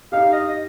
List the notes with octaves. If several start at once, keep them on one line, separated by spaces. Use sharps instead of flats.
D#4 G4 F5
D#5